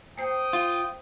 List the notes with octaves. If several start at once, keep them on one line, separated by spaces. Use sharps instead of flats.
A#3 C5 G5 D#6
F4